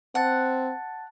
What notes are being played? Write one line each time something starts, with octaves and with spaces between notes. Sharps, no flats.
C4 F#5 A5 A6